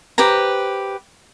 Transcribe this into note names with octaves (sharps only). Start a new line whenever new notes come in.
G4 B4 C5 A#5